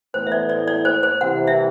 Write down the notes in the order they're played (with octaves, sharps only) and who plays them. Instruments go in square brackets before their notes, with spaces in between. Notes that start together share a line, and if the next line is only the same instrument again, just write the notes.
[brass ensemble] A2 E3 B3 [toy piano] C5
[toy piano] E5
D5
D5
D5
C5
C5
[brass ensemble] C2 C3 E3 [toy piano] F#5
[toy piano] E5